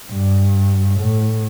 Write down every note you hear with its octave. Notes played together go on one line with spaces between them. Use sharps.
G2
A2